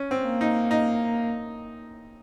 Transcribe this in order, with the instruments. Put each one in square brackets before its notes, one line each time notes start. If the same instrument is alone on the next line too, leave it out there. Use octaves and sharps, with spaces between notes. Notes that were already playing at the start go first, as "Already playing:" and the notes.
Already playing: [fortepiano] C#4
C4
[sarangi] A#3
[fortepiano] D#4
D#4